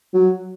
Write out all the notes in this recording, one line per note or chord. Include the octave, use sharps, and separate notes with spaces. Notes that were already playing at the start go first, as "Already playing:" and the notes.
F#3